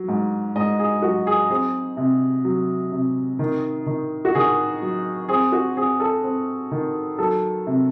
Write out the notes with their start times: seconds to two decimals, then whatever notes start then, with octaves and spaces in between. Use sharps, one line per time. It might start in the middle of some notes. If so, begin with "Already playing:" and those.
Already playing: F#3
0.08 G#2
0.56 G#2 D#5
0.79 G#4
1.02 F#3 F#4
1.27 G#4
1.50 C4 G#4
1.97 C3
2.45 F#3
2.92 C3
3.39 D#3
3.86 D#3
4.25 F#4
4.35 D#3 G#4
4.82 F#3
5.29 C4 G#4
5.52 F#4
5.76 C4 G#4
6.00 A4
6.24 C4
6.71 D#3
7.19 F#3 A4
7.67 C3